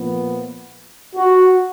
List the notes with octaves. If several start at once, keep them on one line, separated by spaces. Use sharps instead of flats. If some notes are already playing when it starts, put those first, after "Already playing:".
Already playing: A#2 F3 B3
F#4